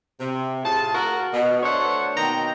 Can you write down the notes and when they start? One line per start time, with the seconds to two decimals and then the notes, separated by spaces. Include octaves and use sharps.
0.20 C3
0.64 A2 F4 G#4 A5
0.94 F#4 A#4
1.33 B2
1.63 A3 D4 A4 C5 C#5 F#5
2.16 B2 D#3 A#3 D#4 G5 A#5